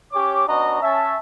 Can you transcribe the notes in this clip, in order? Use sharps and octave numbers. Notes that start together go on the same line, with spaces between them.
C#4 G4 C#5 D6
B3 C#4 D4 F#4 D#5 A#5
C#4 E5 A5